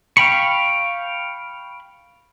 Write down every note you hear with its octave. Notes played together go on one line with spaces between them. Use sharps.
F5 G5 B5 C#6